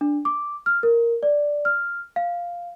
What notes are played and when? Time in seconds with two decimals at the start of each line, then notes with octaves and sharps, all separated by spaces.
0.01 D4
0.25 D6
0.66 F6
0.83 A#4
1.23 D5
1.65 F6
2.16 F5